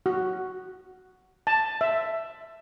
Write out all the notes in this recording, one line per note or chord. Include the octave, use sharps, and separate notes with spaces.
F#4
A5
E5